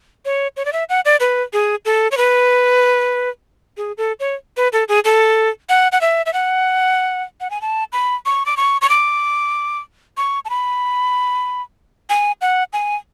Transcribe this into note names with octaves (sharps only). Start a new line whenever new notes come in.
C#5
C#5
D5
E5
F#5
D5
B4
G#4
A4
C#5
B4
G#4
A4
C#5
B4
A4
G#4
A4
F#5
F#5
E5
E5
F#5
F#5
G#5
A5
B5
C#6
D6
C#6
C#6
D6
C#6
A5
B5
G#5
F#5
G#5